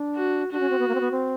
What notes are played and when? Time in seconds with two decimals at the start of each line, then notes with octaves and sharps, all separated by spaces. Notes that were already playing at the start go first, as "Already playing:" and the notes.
Already playing: D4
0.16 F#4
0.51 D4 F#4
0.60 C#4
0.70 C4
0.79 B3
0.88 A#3
0.95 C4
1.01 B3
1.11 C4